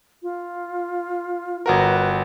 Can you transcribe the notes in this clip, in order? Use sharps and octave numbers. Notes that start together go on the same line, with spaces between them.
F4
G1 F#4 A#4 B4